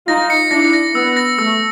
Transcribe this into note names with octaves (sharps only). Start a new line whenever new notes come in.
D#4 F4 A#6
C#7
D4 E4 A#6
A#6
B3 E6
A#6
A3 E6